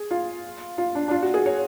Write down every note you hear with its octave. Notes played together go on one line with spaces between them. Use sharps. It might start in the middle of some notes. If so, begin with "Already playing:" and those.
Already playing: G#4
F4
F4
D4
D4
F4
F#4
G#4
C#5